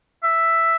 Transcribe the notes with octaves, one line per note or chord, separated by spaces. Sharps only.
E5